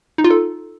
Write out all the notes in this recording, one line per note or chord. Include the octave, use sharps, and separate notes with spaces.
D#4
F4
A4